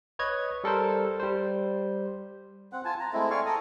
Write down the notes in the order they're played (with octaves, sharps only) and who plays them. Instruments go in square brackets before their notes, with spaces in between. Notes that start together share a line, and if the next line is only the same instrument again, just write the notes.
[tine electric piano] B4 C#5 D#5 G#6
G3 A4 A#4 C5
G3 C5
[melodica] C4 F#5
F4 G#5 A5
A#5
G#3 A3 C4 E4
D5 F5 G#5 C#6
A4 A#5 D#6